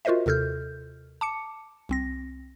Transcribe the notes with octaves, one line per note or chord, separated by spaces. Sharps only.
F4 F#4 A#4 C5 D#5 E5
D#2 C3 A4 F6 G6
A5 D6 C#7
C2 C4 A#6